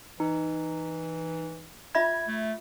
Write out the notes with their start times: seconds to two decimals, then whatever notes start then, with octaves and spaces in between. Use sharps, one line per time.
0.20 E3 D#4
1.95 F4 E5 B5 G#6
2.28 A3